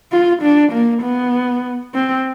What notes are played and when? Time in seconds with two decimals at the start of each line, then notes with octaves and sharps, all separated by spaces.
0.12 F4
0.42 D4
0.72 A#3
1.02 B3
1.94 C4